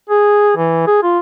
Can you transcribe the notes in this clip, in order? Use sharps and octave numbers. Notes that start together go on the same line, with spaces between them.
G#4
E3
G#4
F4